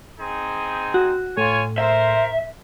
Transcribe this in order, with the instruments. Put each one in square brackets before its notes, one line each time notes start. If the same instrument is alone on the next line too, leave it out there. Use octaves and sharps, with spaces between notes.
[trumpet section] C4 D#4 G#4
[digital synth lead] F#4
[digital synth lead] A2 [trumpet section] F4 C#5 G#5
[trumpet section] A#4 C5 [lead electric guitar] E5